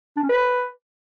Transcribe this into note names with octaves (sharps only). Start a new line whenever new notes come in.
D4
C#4
B4